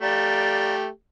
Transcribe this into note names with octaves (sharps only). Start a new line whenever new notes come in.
A3 G4 D5 F5 A#5